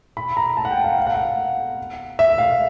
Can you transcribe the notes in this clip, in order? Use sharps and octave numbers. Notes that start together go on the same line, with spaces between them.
B5
A#5
A5
F#5
G5
F5
F5
F#5
F5
E5
F5